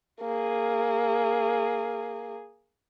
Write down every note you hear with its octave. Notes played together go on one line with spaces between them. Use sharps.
A#3 G#4